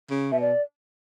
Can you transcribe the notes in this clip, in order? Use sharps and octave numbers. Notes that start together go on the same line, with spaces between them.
C#3
B2 E5
D5